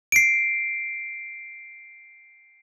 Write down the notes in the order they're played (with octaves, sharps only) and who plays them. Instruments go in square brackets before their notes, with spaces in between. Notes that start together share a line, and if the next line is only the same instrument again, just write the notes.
[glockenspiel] C7 D7